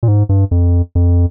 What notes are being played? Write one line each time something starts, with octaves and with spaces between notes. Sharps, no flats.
A#2
G#2
G2
F2
F2